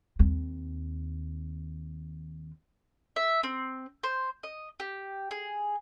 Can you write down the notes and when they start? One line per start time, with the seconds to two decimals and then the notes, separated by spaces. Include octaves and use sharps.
0.19 D#2 C4
3.16 E5
3.43 C4
4.03 C5
4.43 D#5
4.80 G4
5.31 G#4